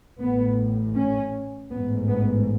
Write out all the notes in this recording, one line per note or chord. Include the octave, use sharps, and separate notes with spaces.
A1 A2 B3
C#4
A1 G#2 B3
B3